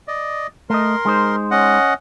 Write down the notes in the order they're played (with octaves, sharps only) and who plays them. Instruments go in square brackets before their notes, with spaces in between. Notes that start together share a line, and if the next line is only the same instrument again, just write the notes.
[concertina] D5 D#5
[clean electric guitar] A3 D#5 [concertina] A#4 C6
[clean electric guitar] G#3 D#4 C5
[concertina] C#4 D#5 F#5